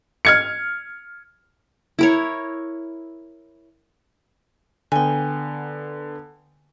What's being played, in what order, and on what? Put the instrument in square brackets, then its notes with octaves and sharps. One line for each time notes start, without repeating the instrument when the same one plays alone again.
[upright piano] F6 G#6 C#7
[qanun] E4 A#4 C#5
[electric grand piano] D3 B3 [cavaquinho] G5 G#5